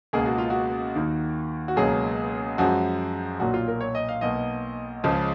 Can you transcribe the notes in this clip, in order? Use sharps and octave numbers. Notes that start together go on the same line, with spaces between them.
C#2 B2 A#3 G#4
F#4
F4
F#4
D#2 D#3 A#3
F#4
C#2 B2 F#3 A#3 G#4
F#2 F3 G#3 F#4
B1 A#2 F#3 A#3 F#4
F4
A#4
C#5
D#5
F5
B1 B2 A#3 D#5
C#2 C#3 F3